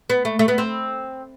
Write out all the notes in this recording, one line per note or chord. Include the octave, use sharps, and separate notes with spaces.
B3
A3
A3
B3
C4